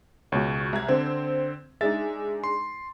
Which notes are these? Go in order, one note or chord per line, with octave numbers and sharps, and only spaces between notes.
C#2 B2 C#5
C2 G#6
D3 C4
G#3 D4 D#4 E5 A6
C6